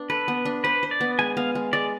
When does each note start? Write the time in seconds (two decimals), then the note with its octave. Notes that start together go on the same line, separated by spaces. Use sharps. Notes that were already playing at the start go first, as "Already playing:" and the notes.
Already playing: B3 D4
0.10 A4 B4
0.28 B3
0.45 D4
0.64 B4 C5
0.83 C5
0.91 D5
1.01 B3
1.19 G#3 G#5
1.37 B3 F5
1.55 G#3
1.73 G#3 D5